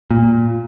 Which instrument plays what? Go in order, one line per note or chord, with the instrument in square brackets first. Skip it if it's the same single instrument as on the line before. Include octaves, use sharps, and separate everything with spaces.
[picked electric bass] A#2